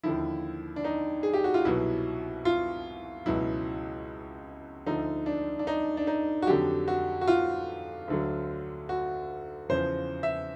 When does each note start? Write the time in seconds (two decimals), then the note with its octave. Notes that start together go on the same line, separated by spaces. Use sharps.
0.03 D#2 D3 F3 E4
0.76 D4
0.84 D#4
1.23 G#4
1.34 G4
1.44 F#4
1.54 F4
1.65 C2 B2 F#3 E4
2.45 F4
3.26 C#2 B2 F#3 E4
4.86 D2 D3 F3 D#4
5.26 D4
5.59 D4
5.67 D#4
5.97 D4
6.07 D#4
6.42 F#4
6.47 F2 D3 F#3 G4
6.88 F#4
7.21 F#4
7.28 F4
8.08 D2 D3 F#3
8.89 F#4
9.69 E2 C#3 F3 C5
10.23 E5